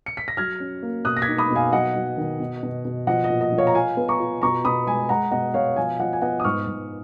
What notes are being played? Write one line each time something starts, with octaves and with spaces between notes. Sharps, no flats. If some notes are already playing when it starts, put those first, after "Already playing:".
C#7
B6
A#6
F#3 F6 G#6
C#4
A#3
B2 D#6 F#6
A#6
G#6 B6
D#4
B5 D#6
B2
F5 G#5
F#3 D#5 F#5
F#3
D#3
B2
B2
B2
F3 D#5 F#5
D#5
A#2
D#5
F3
C#5 F5
A#5
F4 F5 G#5
B3
A#5 C#6
F4
B2 A#5 C#6
B2 B5 D#6
G#3 G#5 B5
G#3 F#5 A#5
B2 D#5 F#5
B2 C#5 F5
F3 F5 G#5
F3 D#5 F#5
G#5
B3 D#5 F#5
D#6
G#2 C#6 F6
G#2